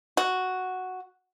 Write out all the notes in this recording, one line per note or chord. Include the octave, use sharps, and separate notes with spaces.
F#4